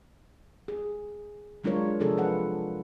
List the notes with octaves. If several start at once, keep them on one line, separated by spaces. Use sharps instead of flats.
G#4
F#3 G#3 D4 F4 A#4 C#5
C3 F3 D4 G#4 A4
F4 B4 F#5